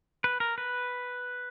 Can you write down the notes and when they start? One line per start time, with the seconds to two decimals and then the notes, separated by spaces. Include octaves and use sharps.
0.24 B4
0.40 A#4
0.58 B4